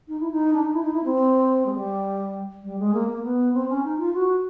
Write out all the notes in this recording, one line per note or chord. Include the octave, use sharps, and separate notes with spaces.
D#4
E4
D#4
D4
D#4
E4
D#4
E4
C4
G#3
G3
G3
G#3
A#3
A#3
B3
C4
C#4
D#4
F4
F#4